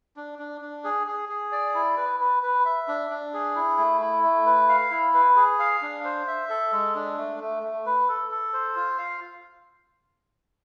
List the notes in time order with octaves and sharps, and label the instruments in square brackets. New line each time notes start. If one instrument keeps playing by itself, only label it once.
[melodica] D4
D4
D4
G#4
G#4
G#4
D5
E4
B4
B4
B4
E5
D4
D4
G#4
E4
A3
E4
A3
B4
F5
E4
B4
G#4
F5
D4
C5
E5
A4
G#3
D4
A3
A3
A3
B4
A4
A4
C5
F4
F5